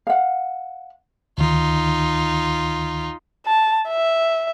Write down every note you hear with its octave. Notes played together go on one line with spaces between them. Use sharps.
F5 F#5
D2 D#3 D#4 F4
A5
E5